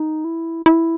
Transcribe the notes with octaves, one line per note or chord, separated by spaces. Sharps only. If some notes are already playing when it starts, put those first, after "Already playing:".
Already playing: D#4
E4
E4